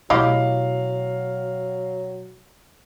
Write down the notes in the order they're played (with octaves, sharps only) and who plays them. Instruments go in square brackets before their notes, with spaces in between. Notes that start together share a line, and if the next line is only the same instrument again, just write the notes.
[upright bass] B2 A3 [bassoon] F#3 [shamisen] E4 G4 D#5 [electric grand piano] F5